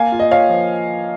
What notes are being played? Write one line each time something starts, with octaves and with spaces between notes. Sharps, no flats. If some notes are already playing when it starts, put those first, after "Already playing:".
Already playing: A#3 F5 G#5
F4
D#5
F4 C#5 F5
F3